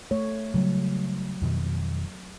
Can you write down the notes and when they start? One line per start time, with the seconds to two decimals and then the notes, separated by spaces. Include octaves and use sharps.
0.11 A3 C#5
0.54 C#3 F#3 G3 A3
1.42 F2 B2 D#3